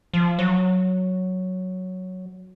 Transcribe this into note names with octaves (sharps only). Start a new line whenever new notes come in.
F3
F#3